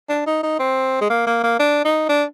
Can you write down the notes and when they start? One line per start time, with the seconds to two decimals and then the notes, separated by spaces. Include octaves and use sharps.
0.09 D4
0.26 D#4
0.43 D#4
0.59 C4
1.01 G#3
1.10 A#3
1.27 A#3
1.43 A#3
1.59 D4
1.85 D#4
2.09 D4